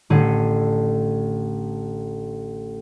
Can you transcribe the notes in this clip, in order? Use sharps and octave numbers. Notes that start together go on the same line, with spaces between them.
A1 D3 G#4 A4 D#7